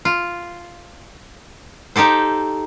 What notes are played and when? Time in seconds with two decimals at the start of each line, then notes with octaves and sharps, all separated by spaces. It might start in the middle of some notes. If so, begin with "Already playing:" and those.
0.05 F4
1.96 D#4 G4 A4 C5